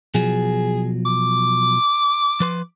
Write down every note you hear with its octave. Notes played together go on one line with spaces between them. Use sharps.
B2 F3 F#3 G#4
D6
F3 B4 C6